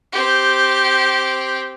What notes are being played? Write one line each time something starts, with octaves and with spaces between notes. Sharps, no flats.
C4 G4